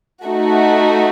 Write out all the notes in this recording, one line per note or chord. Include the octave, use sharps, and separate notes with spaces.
A3 D#4 F#4